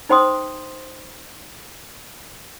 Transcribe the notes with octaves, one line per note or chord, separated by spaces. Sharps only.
D#4 C5 G5 C6 D#6